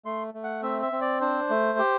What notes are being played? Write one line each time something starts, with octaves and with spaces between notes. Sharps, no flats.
A3 C6
A3
F#5
C4 E5
E5
C4
D5
D4 C5
A3
G4